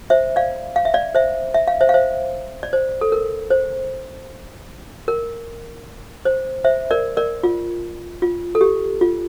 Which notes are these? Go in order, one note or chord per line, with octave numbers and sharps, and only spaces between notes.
C5 E5
D5 F5
F5
E5
D5 F5
C5 E5
E5
F5
C5 E5
F5
C5 E5
D5
C5
A4
A#4
C5
A#4
C5
C5 E5
A#4 D5
A#4 D5
F4
F4
A4
G4
F4